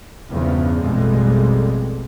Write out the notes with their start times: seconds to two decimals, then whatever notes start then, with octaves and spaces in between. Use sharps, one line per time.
0.29 E2 G2 C#3 F3
0.79 A1 F2 B2 G3 G#3